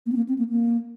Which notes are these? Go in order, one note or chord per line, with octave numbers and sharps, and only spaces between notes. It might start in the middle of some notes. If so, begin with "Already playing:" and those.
A#3
C4
A#3
C4
A#3
A#3